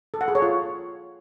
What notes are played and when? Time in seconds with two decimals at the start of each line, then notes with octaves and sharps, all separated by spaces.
0.14 A4
0.21 F#5
0.28 G#4
0.35 C#5
0.42 F4